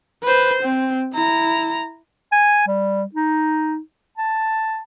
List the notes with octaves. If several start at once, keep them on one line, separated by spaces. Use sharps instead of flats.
B4 C5
C4
E4 A#5
G#5
G3
D#4
A5